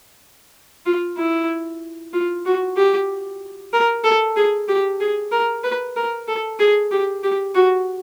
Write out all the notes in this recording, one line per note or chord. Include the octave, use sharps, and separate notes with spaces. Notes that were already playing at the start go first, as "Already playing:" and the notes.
F4
E4
F4
F#4
G4
A#4
A4
G#4
G4
G#4
A#4
B4
A#4
A4
G#4
G4
G4
F#4